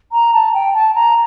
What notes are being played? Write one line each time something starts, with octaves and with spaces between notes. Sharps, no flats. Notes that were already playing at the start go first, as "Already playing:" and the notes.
A#5
A5
G5
A5
A#5